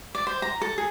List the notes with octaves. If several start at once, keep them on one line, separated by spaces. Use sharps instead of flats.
D5
C5
A#5
A4
G#4